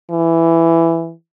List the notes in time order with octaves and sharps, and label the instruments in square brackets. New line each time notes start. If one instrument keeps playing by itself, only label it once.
[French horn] E3